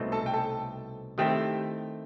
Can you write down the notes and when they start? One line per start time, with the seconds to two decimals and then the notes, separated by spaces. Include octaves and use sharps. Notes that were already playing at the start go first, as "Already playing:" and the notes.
Already playing: C2 B2 A3 C4 D#4
0.12 A4 A5
0.26 G5
0.33 A4 A5
1.18 D#3 A3 C4 E4 G4 G5